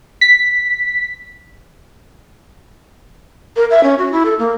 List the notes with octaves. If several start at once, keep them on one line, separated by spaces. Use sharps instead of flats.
B6
A#4
E5
C#4
F#4
E4
A4
A#3